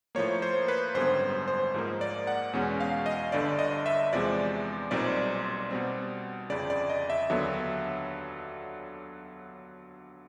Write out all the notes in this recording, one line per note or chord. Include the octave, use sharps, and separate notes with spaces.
A2 F3 A#3 C#5
C5
B4
G#1 F#2 D3 G3 B3 C5
C5
G#2 F3 A#3
D5
F#5
E2 B2 G#3 C#4
F5
D#5
G1 G2 D3 D5
D#5
E5
E2 C3 F3 G#3 D5
B1 A#2 G3 C4 D#4 D5
B2 G3 C4
G1 F2 C#3 D5
D5
D#5
E5
D#2 D3 F#3 B3 D4